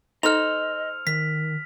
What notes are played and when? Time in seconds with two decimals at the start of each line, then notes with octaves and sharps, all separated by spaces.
0.23 D#4 A4 C5 D#5 F6 F7
1.07 D#3 B6